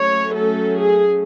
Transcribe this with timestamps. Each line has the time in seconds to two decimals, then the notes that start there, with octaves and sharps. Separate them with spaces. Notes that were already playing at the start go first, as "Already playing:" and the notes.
Already playing: F#3 A3 C#4 C#5
0.34 A4
0.77 G#4